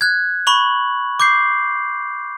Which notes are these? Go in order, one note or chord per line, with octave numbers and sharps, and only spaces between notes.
F#6 G#6
B5 C#6 F#7
D6 G6 C7